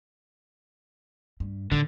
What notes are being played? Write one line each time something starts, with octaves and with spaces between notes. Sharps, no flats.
G2
A2 D3 D#3